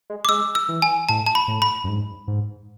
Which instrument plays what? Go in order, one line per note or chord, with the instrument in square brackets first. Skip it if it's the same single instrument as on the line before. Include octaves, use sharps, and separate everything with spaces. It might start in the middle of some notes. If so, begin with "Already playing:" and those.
[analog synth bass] G#3
[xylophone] D6
[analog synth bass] G#3 [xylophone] E6
[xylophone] E6
[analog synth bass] E3
[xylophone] G#5
[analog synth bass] A2 [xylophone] A5
[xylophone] A5
B5
[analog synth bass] A2
[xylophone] B5
[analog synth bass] F#2
G#2
G#2